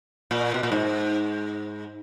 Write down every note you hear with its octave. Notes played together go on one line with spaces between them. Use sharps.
A#2
B2
A#2
G#2